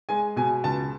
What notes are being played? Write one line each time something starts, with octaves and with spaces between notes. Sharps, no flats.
G#3 G#5
B2 G#5
C#2 A5